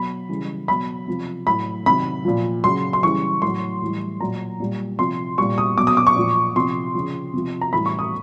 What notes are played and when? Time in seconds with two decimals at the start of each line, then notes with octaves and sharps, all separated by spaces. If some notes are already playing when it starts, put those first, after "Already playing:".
Already playing: B2 F#3 B5
0.29 C#3 E3 G3
0.68 B2 F#3 B5
1.08 C3 F3
1.47 A2 F#3 B5
1.86 C3 D#3 F#3 B5
2.25 A#2 F3
2.64 C#3 F#3 C6
2.93 C6
3.03 C#3 E3 G3 C#6
3.42 A2 F#3 C6
3.82 A2 E3 G3
4.20 A#2 F#3 A#5
4.60 A#2 G3
4.99 C3 F3 C6
5.38 A#2 G3 C#6
5.58 D#6
5.78 B2 F#3 D6
5.87 D#6
5.97 D6
6.07 C#6
6.16 A#2 F3
6.56 C3 F3 C6
6.95 C#3 F3
7.33 C3 F3
7.61 A#5
7.73 A2 E3 G3 B5
7.86 C#6
7.99 D#6